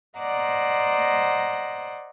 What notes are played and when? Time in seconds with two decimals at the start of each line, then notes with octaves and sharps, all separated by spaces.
0.19 C5 D5 D#5 F#5 A#5